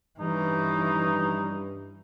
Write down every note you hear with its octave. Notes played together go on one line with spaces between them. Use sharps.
G2 E3 C#4 D#4